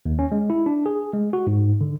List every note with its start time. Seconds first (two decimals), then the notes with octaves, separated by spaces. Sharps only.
0.06 D#2
0.19 C#4
0.32 G#3
0.50 E4
0.66 D4
0.86 G#4
1.14 G#3
1.33 F#4
1.47 G#2
1.81 D3